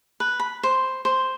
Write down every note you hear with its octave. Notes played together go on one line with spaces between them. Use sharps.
B4
B5
C5
C5